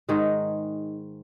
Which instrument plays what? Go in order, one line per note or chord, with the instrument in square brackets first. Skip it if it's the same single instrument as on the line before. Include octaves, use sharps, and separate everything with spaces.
[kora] G#2 D#3 G#3 D#4